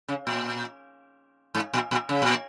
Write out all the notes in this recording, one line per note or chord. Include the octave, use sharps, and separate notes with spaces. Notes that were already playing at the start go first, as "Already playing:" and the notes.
C#3
A#2
G#2
A#2
A#2
C#3
A#2